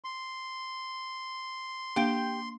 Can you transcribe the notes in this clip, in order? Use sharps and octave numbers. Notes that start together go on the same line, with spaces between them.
C6
A#3 D4 G4 F5 G5